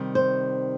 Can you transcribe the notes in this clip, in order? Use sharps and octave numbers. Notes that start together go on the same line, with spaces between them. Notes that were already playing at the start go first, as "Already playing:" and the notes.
Already playing: C3 D#3 G3
C5